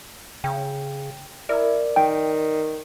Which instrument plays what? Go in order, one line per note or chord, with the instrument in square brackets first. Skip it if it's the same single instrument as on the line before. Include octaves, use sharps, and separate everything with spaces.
[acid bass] C#3 [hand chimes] G5
[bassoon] E4 [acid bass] A#4 [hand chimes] D5
[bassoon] D#3 [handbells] G5